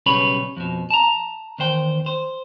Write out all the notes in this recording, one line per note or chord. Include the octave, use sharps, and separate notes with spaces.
B1 C#3 G3 B4 C#5 B5
F2 B2
A5 A#5
E2 D#3 C5 G5
C5